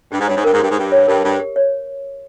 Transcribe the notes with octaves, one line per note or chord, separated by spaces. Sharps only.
G2 G4
G#2
G2 C#5
G#2
G2 A#4
G#2
G2 G4
G#2
G2 G4
C#5
G2 A#4
G2 G4
G4
C#5